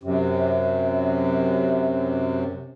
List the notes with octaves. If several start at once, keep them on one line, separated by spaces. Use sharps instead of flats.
F#2 C3